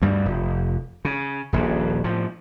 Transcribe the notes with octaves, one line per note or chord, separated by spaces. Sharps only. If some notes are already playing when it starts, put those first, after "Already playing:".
D2 G2 G3
F1
C#3
D#1 A#1 C#3
A2 F3